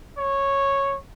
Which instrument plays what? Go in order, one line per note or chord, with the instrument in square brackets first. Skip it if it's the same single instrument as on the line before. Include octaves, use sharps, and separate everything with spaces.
[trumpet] C#5